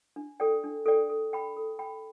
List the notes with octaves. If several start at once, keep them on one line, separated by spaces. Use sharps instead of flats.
D4
A4 D5 G5
D4
A4 D5 G5
A4
G5 B5
A4
G5 B5